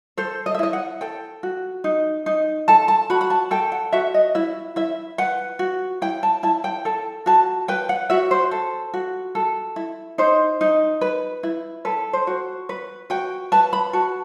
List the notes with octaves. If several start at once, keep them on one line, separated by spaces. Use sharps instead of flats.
A4 C5
D#5
E5
E4 D#5
F#5
A4 G5
F#4
D#4
D#4
A4 A5
A5
F#4 B5
B5
A5
A4 G5
F#5
F#4 E5
D#5
E4 E5
E4 E5
B4 F#5
F#4
E4 G5
A5
E4 A5
G5
A4 A5
F#4 A5
B4 G5
F#5
F#4 E5
C5
A4
F#4
A4
E4
D#4 C5
D#4
B4
E4
A4 B4
C5
F#4
B4
F#4 G5
B4 A5
B5
F#4 A5